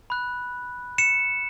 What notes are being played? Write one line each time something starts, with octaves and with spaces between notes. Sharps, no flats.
B5 F#6
C#7 E7